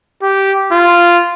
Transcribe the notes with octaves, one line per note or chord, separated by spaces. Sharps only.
G4
F4